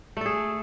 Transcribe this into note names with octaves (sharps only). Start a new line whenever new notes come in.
A3 G#4 A4